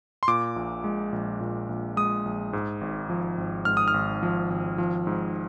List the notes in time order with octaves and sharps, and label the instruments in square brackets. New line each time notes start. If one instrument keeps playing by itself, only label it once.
[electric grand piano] C6
A#2 D6
A#1
G#3
A#1
A#2
A#1
G#3 D#6
A#1
G#2
G#1
F3
G#1
G#2 F6
D#6
F6
G#1
F3
G#1
F3
G#2